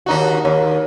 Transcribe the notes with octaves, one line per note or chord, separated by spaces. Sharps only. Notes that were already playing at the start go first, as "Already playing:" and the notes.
D#2 D#4 F#4
D#2